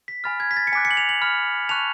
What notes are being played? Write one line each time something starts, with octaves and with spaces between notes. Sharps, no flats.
B6
G#5 B5 F6 A6
G#6
B6
A6
C#7
G#5 D6 F#6 B6
C#7
F#7
F7
F#7
B5 F6
A5 C#6 F#6 F7